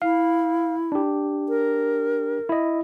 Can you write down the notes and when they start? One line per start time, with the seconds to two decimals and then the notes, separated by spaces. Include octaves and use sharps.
0.02 E4 F5
0.92 D4 G4
1.49 A#4
2.49 E4 D#5